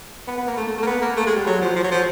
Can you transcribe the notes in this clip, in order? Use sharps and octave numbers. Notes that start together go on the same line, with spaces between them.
B3
B3
A#3
A3
A3
A3
A#3
B3
A#3
A3
G#3
G3
F#3
F3
F3
F#3
F3